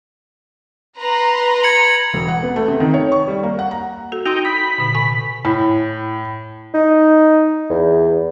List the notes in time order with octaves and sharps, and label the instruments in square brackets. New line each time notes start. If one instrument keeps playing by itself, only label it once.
[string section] B4 A#5 C6
[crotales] G#6 C#7 F#7
[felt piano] E1
F#5
B3
A3
C3
D#3
C#5
C#6
G3
A#3
F#5
A#5
[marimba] F#4 A4
[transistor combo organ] D#4 G5 [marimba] F#4 C6
[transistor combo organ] B5 [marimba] D#6
[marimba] A#2 D3
C3 G#5
[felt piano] A2
[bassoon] D#4
E2